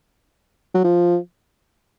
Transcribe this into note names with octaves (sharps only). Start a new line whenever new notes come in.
F#3
F3